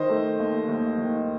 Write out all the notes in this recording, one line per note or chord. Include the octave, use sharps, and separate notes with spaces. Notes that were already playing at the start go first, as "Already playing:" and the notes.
Already playing: D#3 C5 D#5
A3
D#2
D#2
D#3